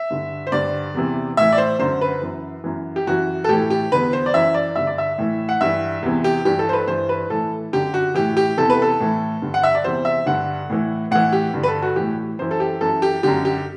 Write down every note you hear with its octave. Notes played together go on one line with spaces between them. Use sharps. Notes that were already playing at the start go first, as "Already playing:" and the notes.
Already playing: E5
G2 D3
C5
G2 D3 D5
E2 C3 E3
A2 E3 E5
D5
C5
F#2 D3 C5
B4
F#2 E3
F#2 E3
G4
F#2 E3 F#4
A4
A2 E3 G4
G4
E2 D3 B4
C5
D5
F#2 E3 E5
D5
G2 D3 E5
D5
E5
A2 E3
F#5
G2 E3 E5
E2 C3 E3
G4
G2 E3 G4
A4
C5
B4
G2 E3 C5
B4
A2 E3 A4
F#2 D3 G4
F#4
A2 E3 G4
G4
E2 C3 E3 A4
B4
A4
A2 E3
G2 D3
F#5
E5
D5
E2 C3 E3 C5
E5
G2 D3 F#5
A2 E3
A2 E3 F#5
G4
G2 D3
B4
A4
F#4
A2 E3 G4
F#2 E3 C5
A4
G4
F#2 E3 A4
G4
F#2 D3 G4
G4